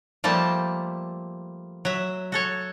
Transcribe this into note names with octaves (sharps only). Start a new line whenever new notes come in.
F3 G3 A3 A#3 A5
F#3 E5
F#4 A4 C#5